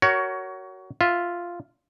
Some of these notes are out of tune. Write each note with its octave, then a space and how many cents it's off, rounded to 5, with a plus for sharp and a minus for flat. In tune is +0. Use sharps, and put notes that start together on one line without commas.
F#4 +20 A#4 +0 C#5 +15
F4 +0 E5 +0